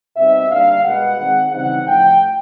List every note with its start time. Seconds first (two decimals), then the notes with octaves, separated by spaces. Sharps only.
0.15 B2 G3 C4 D#4 E5
0.49 D3 G3 A#3 D4 F5
0.84 B2 G#3 B3 F#5
1.18 D#3 G#3 C4 D#4
1.52 C#3 E3 G3 C4 D#4 F#5
1.86 A2 F3 A3 G5